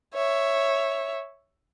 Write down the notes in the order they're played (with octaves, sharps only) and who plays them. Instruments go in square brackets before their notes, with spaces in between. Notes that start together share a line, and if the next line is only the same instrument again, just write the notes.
[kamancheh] C#5 E5